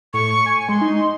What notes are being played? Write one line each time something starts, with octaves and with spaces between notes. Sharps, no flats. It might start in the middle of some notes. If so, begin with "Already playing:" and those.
A2 C#6
G#5
G#3 C6
D#4